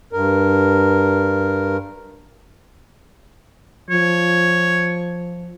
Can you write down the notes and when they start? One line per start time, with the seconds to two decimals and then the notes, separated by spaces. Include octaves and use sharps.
0.13 G2 A#4
3.90 F3 C#5